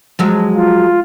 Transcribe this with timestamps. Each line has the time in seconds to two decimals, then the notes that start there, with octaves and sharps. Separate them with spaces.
0.19 F3 F#3 G#3
0.55 F4